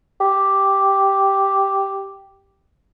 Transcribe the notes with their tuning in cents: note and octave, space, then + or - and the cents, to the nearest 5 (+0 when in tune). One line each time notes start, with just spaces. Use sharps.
G4 -5